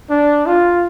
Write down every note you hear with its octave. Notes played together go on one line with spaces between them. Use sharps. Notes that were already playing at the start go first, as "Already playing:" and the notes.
D4
F4